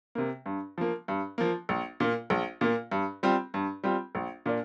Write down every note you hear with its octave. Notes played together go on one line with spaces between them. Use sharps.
C3 A#3
G2
F3 A#3
G2
F3 A#3
A#1
A#2 A#3
A#1
A#2 A#3
G2
G3 C4 F4
G2
G3 C4 F4
A#1
A#2 A#3 D4